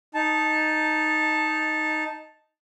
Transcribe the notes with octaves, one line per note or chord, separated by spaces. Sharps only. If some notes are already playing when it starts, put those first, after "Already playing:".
D#4 A5